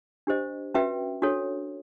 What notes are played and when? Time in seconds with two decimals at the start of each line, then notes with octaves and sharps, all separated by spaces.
0.27 D4 G4 C5 D#5
0.74 C#4 F#4 B4 E5 G5
1.22 D4 F#4 A4 C#5